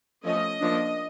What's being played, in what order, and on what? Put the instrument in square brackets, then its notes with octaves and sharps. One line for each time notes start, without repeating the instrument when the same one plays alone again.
[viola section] F3 A3 C#4 D#5
F3 A#3 D4